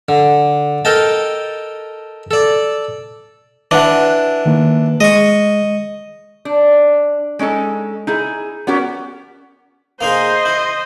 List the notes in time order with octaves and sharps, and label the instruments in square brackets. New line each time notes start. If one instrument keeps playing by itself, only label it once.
[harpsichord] D3
A4 A#4 D#5 G5 A5
A4 D5
[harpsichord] E3 D4 [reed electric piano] F#5 D6
[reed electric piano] D#3 A#3
[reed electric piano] G#3 [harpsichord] D#5 C#6
[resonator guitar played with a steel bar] D4
G#3 C#4 D#4 A4
D#4 E4 G#4
B3 C#4 F#4 G4 A#4
[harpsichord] A#3 D#4 G#4 [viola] C5 D#5
[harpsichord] E4